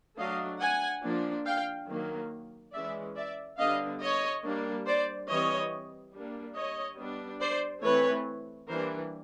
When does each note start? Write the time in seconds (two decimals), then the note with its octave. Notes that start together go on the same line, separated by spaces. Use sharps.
0.18 F#3 A3 D4 D#5 F5
0.61 F#5 G#5
1.03 F3 A#3 D4
1.46 F5 G5
1.88 D#3 F#3 A#3
2.73 E3 G#3 C#4 D5 E5
3.16 D5 E5
3.58 D3 G3 B3 D4 D#5 F5
4.01 C#5 D#5
4.43 G3 A#3 D4
4.86 C5 D5
5.28 E3 G3 C4 C#5 D#5
6.13 G3 A#3 D4
6.56 C#5 D#5
6.98 G3 B3 D4
7.40 C5 D5
7.83 E3 A3 C4 B4 C#5
8.68 E3 G3 A#3 D4 A#4 C5